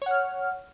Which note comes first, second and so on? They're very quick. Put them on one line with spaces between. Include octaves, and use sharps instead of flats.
C#5 F#5 F6